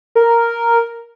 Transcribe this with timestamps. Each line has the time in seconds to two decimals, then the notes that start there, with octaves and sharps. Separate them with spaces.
0.15 A#4